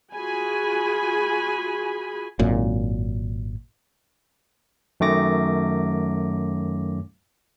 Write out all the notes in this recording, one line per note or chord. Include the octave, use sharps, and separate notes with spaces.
F4 F#4 G#4 G#5 B5
G#1 F#2 A#2
F#2 D#3 A3 D6 A#6